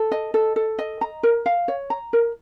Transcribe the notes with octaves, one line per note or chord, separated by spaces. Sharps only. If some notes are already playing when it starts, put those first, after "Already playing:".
Already playing: A4
D#5
A4
A4
D#5
A#5
A#4
F5
C#5
A#5
A#4